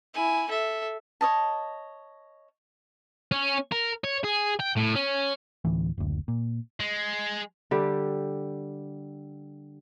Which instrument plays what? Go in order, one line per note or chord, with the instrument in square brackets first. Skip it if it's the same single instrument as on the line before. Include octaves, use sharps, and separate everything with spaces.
[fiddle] E4 G#5
A4 E5
[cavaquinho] C#5 D#5 A5
[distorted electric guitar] C#4
A#4
C#5
G#4
G5
A2
C#4
[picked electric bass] D2 A2 E3
F#1 D2
A#2
[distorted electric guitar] G#3
[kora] D3 G3 G4